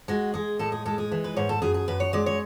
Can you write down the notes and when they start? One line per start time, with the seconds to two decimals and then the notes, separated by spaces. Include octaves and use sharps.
0.08 G#3 F#4
0.34 G#3 G#4
0.59 A2 A4
0.72 G#4
0.85 G#3 A4
0.98 G#4
1.11 E3
1.24 B4
1.36 G#2 C#5
1.49 A4
1.62 F#2 G#4
1.74 G#4
1.88 F#2 B4
2.00 C#5
2.13 G#3 D5
2.26 C#5